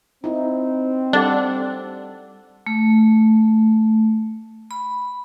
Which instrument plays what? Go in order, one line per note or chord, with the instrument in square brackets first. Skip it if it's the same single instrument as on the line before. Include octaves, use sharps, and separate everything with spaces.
[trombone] C4 [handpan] D#4 E4
[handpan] G3 A4 F#5 [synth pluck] D4
[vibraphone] A3
B5